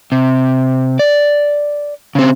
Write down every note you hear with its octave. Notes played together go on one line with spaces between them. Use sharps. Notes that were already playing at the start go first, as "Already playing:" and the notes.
C3
D5
C#3 C4